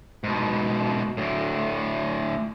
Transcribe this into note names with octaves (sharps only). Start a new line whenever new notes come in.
G#2 B2
D2 A2